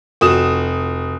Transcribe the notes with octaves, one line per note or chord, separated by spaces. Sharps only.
F1 F#4 D#6 E7